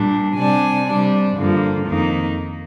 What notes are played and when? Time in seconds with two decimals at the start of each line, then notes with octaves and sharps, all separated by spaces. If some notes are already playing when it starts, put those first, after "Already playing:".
Already playing: A#2 G3 D4
0.36 C3 G3 D4 G#5
0.86 C3 G3 D4
1.37 G2 D3 F3 A#3
1.87 F2 D#3 A#3 D#4